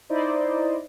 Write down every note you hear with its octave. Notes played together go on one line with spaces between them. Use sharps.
D#4 E4 C5 D5 D#5